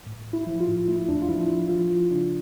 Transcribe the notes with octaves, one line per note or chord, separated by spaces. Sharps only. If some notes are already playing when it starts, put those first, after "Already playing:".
A2
A2
E4
F3
F4
A2
A3 E4
E2 D4
F4
F3 E4
F3 E4
F3 F4
F3
C#3 D4